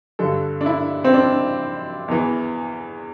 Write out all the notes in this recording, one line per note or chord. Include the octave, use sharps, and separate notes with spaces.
G2 D3 A4
D4
E4
C4
D4
E2 E3